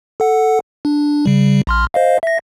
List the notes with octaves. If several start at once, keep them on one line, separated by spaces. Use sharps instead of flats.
A4 F#5
D4
C#3 G3
A#1 C6 F6
C5 D#5 F5
E5 A#6